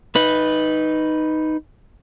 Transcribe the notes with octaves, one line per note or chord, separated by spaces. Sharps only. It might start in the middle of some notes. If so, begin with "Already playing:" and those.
D#4 B4